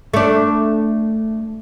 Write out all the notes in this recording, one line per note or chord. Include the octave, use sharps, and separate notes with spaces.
A3 D4